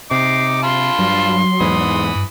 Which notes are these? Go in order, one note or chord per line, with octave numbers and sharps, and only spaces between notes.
C3 D#4 D6 C7
F4 A5 B5 C6
G2 F#3
E2 G#2 E3 B5 D#6
G2